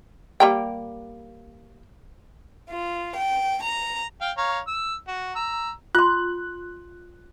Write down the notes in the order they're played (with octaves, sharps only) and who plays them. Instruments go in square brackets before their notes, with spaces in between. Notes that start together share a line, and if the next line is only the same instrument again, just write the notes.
[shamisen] G3 A#3 G5
[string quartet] F4
G5
A#5
[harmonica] F5 G5
C#5 F5 A#5
E6
F#4
A#5 E6
[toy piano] F4 C6 [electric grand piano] F#6